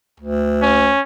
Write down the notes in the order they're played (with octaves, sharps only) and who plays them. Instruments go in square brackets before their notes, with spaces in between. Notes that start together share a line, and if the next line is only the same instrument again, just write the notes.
[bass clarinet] D2
[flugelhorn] C#4